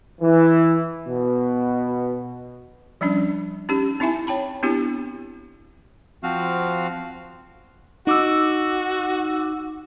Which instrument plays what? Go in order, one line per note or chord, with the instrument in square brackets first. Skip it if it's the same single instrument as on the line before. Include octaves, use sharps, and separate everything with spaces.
[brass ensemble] E3
B2
[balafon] F3 G3 C#4 D4
C#4 D#4 G4
C4 D#4 E4 E5 G#5
C#5 G5 A5 B5
B3 C4 D4 E4 F#4 G4
[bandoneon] F3 C4 F#4 F5
[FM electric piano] D#4 D6 E6 [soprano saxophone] F#4